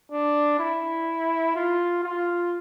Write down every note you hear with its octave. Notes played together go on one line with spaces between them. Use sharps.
D4
E4
F4
F4